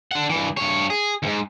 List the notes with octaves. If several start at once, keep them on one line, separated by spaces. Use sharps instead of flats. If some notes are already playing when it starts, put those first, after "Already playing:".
D4 F#5
G2 E3
G2 C#5
G#4
D#2 G#2